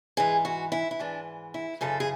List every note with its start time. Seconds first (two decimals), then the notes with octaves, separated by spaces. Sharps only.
0.17 G#2 E3 G#4
0.45 F#4
0.72 E4
0.91 E4
0.99 G#2 E3 D4
1.54 E4
1.81 F#2 C#3 E3 A4
2.00 G#4